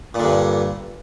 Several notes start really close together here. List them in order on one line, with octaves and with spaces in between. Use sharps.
A#2 D3 G2